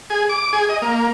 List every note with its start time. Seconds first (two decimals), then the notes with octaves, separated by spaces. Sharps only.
0.10 G#4
0.29 D6
0.53 G#4
0.69 D#5
0.82 A#3